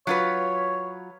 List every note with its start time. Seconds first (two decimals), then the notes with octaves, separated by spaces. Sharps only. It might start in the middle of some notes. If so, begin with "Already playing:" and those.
0.07 F#3 F4 B4 C#5